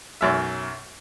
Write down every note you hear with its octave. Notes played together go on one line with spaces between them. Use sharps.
B1 F#2 E5